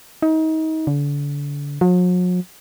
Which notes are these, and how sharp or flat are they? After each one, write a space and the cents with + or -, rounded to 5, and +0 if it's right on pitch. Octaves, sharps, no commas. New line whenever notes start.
D#4 +30
D3 -35
F#3 -45